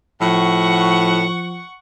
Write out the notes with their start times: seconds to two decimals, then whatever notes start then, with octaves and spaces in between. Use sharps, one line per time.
0.21 A2 F3 F#5 C#6